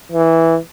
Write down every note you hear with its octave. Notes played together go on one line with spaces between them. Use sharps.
E3